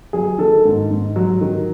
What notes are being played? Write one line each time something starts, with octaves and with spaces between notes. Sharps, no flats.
F#3 G#4
D#3 A4
G#2
G#2
F#3
D#3